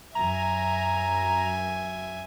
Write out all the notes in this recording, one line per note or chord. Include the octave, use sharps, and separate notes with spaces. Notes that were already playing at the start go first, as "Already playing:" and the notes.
F#2 E5 G#5 A#5